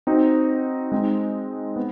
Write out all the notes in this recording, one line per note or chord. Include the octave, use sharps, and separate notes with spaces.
C4 D#4 F#4
G#3 C4 D#4
B3